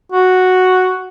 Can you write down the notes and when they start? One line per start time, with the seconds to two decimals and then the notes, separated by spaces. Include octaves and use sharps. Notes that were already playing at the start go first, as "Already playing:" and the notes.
0.12 F#4